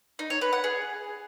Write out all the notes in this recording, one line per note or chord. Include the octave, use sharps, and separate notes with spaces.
D#4
C#5
B4
F#5
G#4